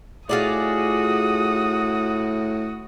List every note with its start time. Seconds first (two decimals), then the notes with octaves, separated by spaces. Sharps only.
0.29 A2 F4 F#4 G#4 D5 D#6